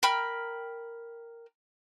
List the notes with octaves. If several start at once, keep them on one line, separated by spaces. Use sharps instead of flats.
A#4 G5 B5 F6